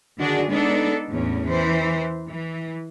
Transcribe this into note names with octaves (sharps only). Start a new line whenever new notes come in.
D3 D#3 D4 F#4 G#4
G#3 B3 D4 D#4 A4
E2 A2 C#4
E3 C5
E3